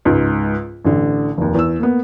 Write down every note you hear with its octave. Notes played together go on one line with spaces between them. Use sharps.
C#2 G#2
A1 D3
F1 D#2
E2 E6
A#3 B3